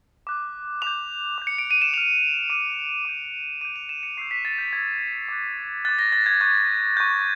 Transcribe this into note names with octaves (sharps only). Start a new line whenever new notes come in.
D6 F#6
D6 G6 F7
D6 G6
C#7
D7
D#7
E7
D6 F6 F7
D6 F6 D#7
D6 G6
D6 G6 D#7
F7
E7
C#7
C#6 E6 G6 C7
B6
A6
G6
C#6 E6 G6 G#6
D6 F#6
D6 F#6 A6
A#6
A6
G#6
C#6 F#6 G#6
C#6 F#6 G6